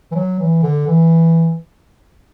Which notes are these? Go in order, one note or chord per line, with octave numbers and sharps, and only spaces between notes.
E3
F#3
E3
D3
E3